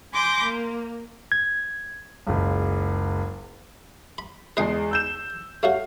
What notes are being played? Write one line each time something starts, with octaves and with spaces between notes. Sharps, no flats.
G#5 B5 C6 D6 G6 A#6
A#3
G#6
F#1 C#2
B5
E2 G#3 B4 D#5 G5 C7
E6 G6 E7
A3 C#4 F#4 F5